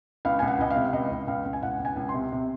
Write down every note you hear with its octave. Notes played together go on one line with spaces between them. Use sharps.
C#2 F5
C#2 G#5
F#5
C#2 D#5
F5
C3
C#2 D#5
C#2
C#2 F5
C#2
G#5
C#2 F#5
C#2
G#5
C#2
C6
C3
C3